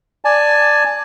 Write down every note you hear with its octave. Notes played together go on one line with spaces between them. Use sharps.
D5 G#5 A5